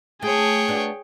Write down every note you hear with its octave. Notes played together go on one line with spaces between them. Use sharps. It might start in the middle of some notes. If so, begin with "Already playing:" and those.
A3 G#4 C#5 G5
B3 D4 F#4